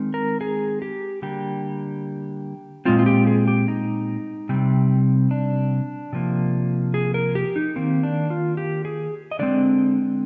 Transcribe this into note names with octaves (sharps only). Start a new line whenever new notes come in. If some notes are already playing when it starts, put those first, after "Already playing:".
Already playing: D#3 G#3 C4
A#4
G#4
G4
D3 G3 A#3 G4
A#2 G#3 C4 F4
F4
G4
G#4
G4
D#4
C3 G3 C4
D4
C3 F3 A#3
G#4
A#4
G4
D#4
D#3 A#3 C4
D4
F4
G4
G#4
D#5
D3 G#3 C4 D5